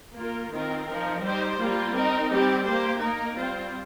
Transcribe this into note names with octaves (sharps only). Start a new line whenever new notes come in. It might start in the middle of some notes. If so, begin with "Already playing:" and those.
A#3 F4 A#4
D#3 C4 F4 A#4
F3 D#4 A#4
G3 D#4 C5
G3 A#3 F4
C4 D#4 A#4
G3 C4 G4
A#3 G4 C5
A#3 D#4 A#4
G3 C4 F4 C5